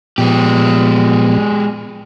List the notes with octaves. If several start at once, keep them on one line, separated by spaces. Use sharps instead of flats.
A#2 F3 G#3 B3 G4